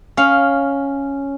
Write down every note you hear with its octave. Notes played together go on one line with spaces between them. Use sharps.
C#4 F5